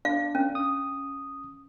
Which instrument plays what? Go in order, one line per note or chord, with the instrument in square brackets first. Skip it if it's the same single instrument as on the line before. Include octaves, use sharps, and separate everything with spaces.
[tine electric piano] D4 [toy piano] F5
[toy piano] C#4
[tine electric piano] D#6